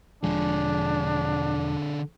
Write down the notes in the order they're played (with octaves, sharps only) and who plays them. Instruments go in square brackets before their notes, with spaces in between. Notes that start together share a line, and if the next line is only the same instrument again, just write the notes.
[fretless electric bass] E1 F3 G#3 [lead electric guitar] D3 G#4 [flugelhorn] D4